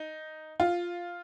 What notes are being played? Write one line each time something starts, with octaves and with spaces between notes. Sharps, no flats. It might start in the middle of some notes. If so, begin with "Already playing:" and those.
Already playing: D#4
F4